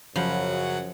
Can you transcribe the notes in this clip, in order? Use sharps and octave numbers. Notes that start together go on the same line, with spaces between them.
F#2 C#3 F3 F#3 F#5 B5